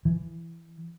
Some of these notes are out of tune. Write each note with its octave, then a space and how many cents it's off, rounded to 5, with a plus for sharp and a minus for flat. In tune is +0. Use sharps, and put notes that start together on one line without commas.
E3 +15